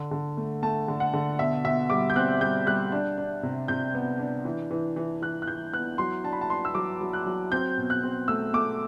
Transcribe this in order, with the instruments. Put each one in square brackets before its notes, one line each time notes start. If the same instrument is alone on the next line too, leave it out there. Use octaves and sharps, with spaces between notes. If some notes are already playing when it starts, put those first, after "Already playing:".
Already playing: [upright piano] D3
D3
A3
A3 A5
D3
F#5
D3
B2 E5
B2 E5
G3 D6
G6
C4 F#6
G3 G6
G3 F#6
D4
D4
C3
C3 G6
B3
D4
E3
E3
E3
E3 F#6
F#6
E3 G6
B3 F#6
F#3 C6
D4 A5
B5
A5
D4 C6
E6
F#3 D6
F#3
F#6
F#3
C4 G6
B2
F#6
C4
A3 E6
A3 D6